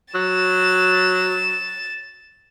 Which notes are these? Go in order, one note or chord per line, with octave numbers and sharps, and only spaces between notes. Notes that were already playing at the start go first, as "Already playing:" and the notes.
F#3 A6 E7